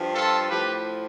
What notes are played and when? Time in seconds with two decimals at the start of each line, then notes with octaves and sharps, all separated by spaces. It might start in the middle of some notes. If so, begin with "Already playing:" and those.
Already playing: G2 F3
0.15 F4 A4
0.50 A2 F3 G4 B4